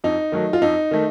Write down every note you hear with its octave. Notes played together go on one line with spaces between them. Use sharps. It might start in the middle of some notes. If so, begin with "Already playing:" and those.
F2 D#4
D#3 F#3 A3
F4
F2 D#4
D#3 A3